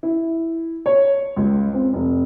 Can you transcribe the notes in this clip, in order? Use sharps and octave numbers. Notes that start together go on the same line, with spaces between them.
E4
C#5
C#2
C4
F1